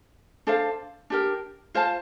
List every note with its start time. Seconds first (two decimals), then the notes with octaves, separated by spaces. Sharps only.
0.47 D4 A4 C5 F5
1.10 D4 G4 A#4
1.74 F4 C5 F5 A5